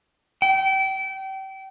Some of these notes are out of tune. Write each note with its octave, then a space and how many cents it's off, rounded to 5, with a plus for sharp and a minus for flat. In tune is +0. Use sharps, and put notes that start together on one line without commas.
G5 -30